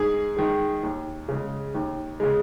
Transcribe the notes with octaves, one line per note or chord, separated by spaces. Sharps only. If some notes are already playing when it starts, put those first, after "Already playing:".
Already playing: G#2 G#4
D#3 G#3
D#2
C#3 G#3
D#2
C#3 G#3